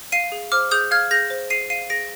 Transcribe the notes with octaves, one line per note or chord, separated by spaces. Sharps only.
F5 C7 D#7
G#4
C5 D6 F6
G#4 D#6 G6
F5 F6 G#6
G#4 G6 A#6
C5
G#4 C7 D#7
F5 C7 D#7
G#4 A#6 D7